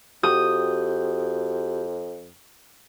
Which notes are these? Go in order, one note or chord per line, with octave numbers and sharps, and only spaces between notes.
F2 F#4 G4 D#6 G6